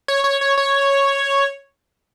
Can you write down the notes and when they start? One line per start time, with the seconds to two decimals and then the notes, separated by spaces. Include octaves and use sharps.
0.08 C#5
0.24 C#5
0.41 C#5
0.57 C#5